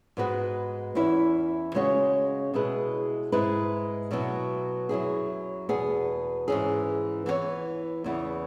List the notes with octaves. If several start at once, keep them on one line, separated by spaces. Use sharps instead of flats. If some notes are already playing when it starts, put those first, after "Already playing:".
G#2 G#3 B3 F#4 B4
E2 E3 C#4 E4
C#3 G#3 C#4 F#4 C#5
B2 G#3 E4 G#4 B4
G#2 G#3 E4 B4
B2 F#3 B3 E4
F#2 F#3 E4 G#4
E2 B2 B3 G#4
G#2 E3 C#4 G#4
E3 B3 F#4 C#5
E2 C#3 E3 B3 E4